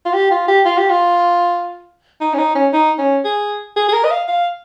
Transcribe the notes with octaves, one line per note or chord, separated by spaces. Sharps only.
F4
G4
F4
G4
F4
G4
F4
D#4
C#4
D#4
C#4
D#4
C#4
G#4
G#4
G#4
A#4
D#5
F5
F5